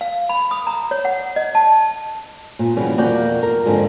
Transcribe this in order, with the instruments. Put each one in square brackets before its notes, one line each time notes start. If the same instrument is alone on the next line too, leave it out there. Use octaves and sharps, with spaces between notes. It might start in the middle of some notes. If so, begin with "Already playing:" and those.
[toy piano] F5
B5
D#6
A#5
C#5
F#5
D#5
A5
[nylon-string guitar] A#2
C#3 E3 G3 A#3 F#4
F2 B2 A#3 F#4 D5 G5
A#4
F2 G#2 D3 A#3